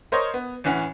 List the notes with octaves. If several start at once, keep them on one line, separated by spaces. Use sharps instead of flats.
A#4 C5 C#5 D#5
B3
A1 E3 C#4 F#5